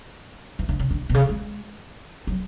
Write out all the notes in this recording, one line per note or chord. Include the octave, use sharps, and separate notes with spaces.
E3
D3
C#3
D3
B2
C#3
G#3
F#3